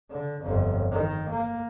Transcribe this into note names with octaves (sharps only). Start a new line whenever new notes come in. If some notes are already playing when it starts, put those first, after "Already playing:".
D3
G1 F2
D#3
A#3